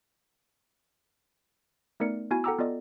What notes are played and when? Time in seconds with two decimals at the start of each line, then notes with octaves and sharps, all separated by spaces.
2.00 A3 B3 D#4 A#4 D5 C#7
2.31 B3 E4 F#4 G#5 G#6
2.44 A4 F#5 G5 A#5 D6 E6
2.59 B3 F4 A4 D5 D#5